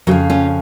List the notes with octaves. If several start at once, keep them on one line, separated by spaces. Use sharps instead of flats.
F2 C#3 F3 F#3
C#4 F4